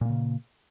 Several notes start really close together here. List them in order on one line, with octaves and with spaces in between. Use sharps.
A#2 A#3 C#3